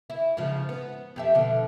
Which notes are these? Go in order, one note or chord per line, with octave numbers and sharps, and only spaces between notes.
E4
G#2 C#3 F3
B3
F2 G4 E5
B2 D3 F3